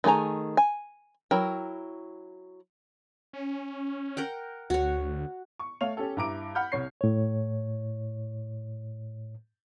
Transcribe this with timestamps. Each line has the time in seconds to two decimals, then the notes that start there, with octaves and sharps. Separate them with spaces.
0.04 D#3 A3 G#4 G#5 A#5
0.57 G#5
1.31 F#3 E4 A#4 G5
3.33 C#4
4.17 A#4 F#5 G5
4.70 D2 F#4 C#5
5.59 C#6
5.81 A3 C#5 F5 F7
5.97 C#4 G4 A4
6.17 G2 E4 A#5 D6 D7
6.55 F#5 B5 F6 G6
6.72 C2 C#5 C7
7.01 A2 C#5